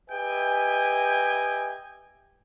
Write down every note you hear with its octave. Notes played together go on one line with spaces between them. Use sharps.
G4 B4 D#5 E5 G5 G#5